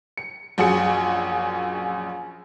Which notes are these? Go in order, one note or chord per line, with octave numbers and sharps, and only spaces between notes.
C#7
A#1 F#2 F#4 G#4 C#7